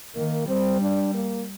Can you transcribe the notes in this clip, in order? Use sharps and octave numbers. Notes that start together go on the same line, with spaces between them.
D#3 A#3
G3 C4
D4
A#3